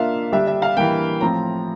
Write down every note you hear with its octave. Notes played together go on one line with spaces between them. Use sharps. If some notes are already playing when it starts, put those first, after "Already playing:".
Already playing: A#3 D4 F4 E5 F5
D3 G3 D4 G4 E5
E5
F5
E3 G3 A#3 G5
A2 F3 C4 A#5